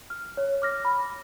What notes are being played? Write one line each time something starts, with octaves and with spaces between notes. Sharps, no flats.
F6
C#5
D6 F6 A#6
B5